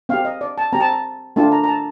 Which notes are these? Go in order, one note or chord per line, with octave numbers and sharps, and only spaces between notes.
C4 G4 F5
D#5
D5
A5
C4 G4 A#5
A5
A#5
A3 D4 F4 A5
A#5
A#5
A5